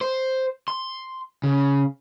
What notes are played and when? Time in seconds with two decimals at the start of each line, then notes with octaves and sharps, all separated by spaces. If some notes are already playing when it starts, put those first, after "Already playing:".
0.01 C5
0.68 C6
1.43 C#3